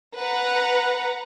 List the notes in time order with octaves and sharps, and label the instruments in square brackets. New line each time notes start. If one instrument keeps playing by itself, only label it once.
[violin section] B4 F#5 A#5